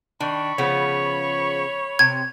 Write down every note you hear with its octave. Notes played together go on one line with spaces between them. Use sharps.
D#3 D4 B5 C#6
C#3 F3 B3 C#5
C3 G#6